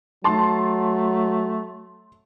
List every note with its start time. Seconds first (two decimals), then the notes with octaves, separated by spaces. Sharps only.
0.24 F#3 A3 A5 C6